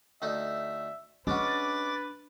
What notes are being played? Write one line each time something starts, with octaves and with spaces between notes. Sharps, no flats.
D2 A3 D#4 E5
G#3 C#4 D4 F#4 B4 D6 A6